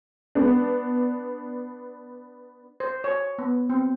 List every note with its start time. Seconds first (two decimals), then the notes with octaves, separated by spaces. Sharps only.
0.35 B3 D4
2.80 C5
3.04 C#5
3.38 B3
3.70 C4